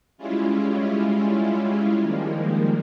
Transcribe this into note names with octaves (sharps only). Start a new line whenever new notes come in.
G3 G#3 C#4 E4 F4
D#3 F3 G3 G#3 A#3